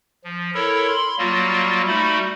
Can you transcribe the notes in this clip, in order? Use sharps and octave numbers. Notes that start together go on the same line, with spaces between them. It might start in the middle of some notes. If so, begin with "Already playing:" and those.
F3
E4 A4 A#4 C#5
B5 C6
F#3 G3 A#3 F4 F#4
G3 A3 D#4 F#4 B5